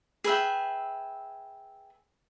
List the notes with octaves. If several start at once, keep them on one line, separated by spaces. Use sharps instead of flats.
G#4 B4 E5 G5